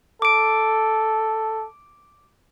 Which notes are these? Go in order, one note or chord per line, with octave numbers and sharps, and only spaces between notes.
A4 D6 D7